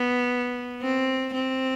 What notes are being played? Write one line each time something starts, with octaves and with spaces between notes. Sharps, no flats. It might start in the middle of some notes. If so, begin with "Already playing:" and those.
Already playing: B3
C4
C4